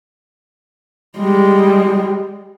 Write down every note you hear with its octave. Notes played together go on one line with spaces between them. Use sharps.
G3 G#3